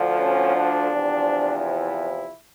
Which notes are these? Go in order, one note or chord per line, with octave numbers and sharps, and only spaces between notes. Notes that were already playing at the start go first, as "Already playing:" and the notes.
Already playing: D2 D3 F3
C#4
D4
E2 C3 F3
E4